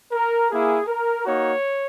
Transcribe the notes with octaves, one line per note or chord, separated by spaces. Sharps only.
A#4
A#3 E4 G#4
A#4
A#3 D#4 F#4 C#5